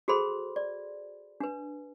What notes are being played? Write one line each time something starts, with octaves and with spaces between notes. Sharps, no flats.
F#4 G#4 A4 C5 B5 C6
D5
D4 B4